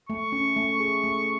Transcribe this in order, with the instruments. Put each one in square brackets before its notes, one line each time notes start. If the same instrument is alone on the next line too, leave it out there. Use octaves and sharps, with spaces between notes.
[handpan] A3 [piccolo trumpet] C#6
[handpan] C#4
A3
G#4
A3